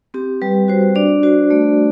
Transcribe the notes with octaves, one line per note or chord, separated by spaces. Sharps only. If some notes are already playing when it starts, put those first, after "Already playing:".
C4 G4
G3 B4
F#4 C5
D4 D5
F#4 C5
A3 D5